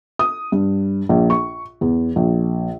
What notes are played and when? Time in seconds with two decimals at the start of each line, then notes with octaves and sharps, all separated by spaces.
0.19 D#6
0.52 G2
1.09 A#1
1.30 C#6
1.81 E2
2.16 A#1